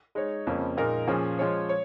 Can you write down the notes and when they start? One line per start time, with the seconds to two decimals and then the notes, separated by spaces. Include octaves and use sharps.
0.15 G#3 D#4 C#5
0.47 F2 C#3 F3 A#3 C#4
0.77 A#2 G#3 D#4 A#4
1.07 A#2 F3 C#4 G#4
1.39 F3 G#3 F4 C#5
1.69 C#5